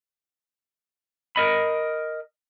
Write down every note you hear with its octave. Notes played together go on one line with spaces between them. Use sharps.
A#4 D#5 B5